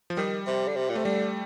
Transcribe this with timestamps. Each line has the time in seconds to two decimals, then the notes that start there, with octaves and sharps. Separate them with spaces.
0.10 F3
0.17 D#3 G3
0.47 C3
0.68 D3
0.76 C3
0.90 A#2
0.95 C3 A3
1.05 D3 G3